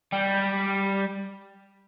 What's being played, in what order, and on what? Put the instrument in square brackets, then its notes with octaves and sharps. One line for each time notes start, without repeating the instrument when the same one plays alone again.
[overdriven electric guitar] G3